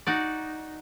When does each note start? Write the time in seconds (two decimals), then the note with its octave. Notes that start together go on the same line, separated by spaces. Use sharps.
0.07 D#4 F#4 D5